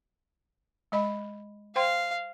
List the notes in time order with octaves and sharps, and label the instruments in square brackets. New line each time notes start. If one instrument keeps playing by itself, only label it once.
[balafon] G#3 D#5 B5
[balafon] C5 G5 C6 [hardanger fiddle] F5